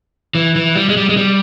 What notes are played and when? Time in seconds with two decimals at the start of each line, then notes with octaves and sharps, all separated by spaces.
0.35 E3
0.56 E3
0.76 G3
0.89 G#3
0.97 G3
1.09 G#3
1.17 G3